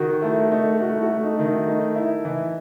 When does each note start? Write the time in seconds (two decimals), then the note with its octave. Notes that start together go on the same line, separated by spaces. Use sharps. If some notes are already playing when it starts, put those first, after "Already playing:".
Already playing: D#3 F#4
0.22 A3 E4
0.51 A3 D#4
0.80 A3 F#4
0.96 E4
1.02 F#4
1.10 A3
1.24 D#4
1.39 D#3
1.46 D#4
1.67 A3 D#4
1.96 E4
2.25 E3